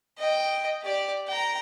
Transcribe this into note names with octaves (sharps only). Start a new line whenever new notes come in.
D#5 G5
G4 D5
G5 A#5